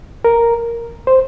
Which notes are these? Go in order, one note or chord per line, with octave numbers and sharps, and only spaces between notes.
A#4
C5